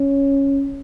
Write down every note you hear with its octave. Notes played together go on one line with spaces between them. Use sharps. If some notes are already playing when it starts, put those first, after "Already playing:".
Already playing: C#4